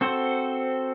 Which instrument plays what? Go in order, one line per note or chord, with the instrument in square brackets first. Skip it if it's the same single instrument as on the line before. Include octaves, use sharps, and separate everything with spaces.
[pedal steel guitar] C4 F#4 A4 C5